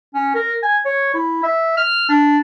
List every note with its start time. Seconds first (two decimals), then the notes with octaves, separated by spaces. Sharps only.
0.14 C#4
0.34 A#4
0.63 G#5
0.85 C#5
1.14 E4
1.43 E5
1.77 F6
2.09 D4